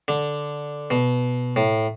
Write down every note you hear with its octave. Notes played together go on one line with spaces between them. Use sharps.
D3
B2
A2